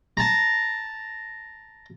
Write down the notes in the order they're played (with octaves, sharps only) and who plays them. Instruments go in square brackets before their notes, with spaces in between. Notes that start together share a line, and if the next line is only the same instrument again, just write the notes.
[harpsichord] A5 A#5